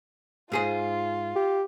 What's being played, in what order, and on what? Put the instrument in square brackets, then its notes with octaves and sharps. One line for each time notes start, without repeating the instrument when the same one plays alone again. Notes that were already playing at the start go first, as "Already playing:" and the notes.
[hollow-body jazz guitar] G#2 G#4 C5 [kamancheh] F4
[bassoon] G4